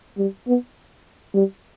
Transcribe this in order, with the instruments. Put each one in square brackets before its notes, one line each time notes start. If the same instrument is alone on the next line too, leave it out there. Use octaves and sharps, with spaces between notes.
[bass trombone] G3
B3
G3